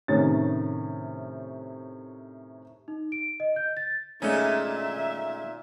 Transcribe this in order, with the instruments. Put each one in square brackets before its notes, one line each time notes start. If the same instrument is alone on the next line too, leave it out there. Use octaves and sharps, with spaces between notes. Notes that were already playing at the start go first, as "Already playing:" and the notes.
[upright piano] A2 C3 D#3 C#4 A6
[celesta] D#4
D7
D#5
G6
A6
[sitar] A#2 D#4 [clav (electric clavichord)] G#3 A3 C#4 [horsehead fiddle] E5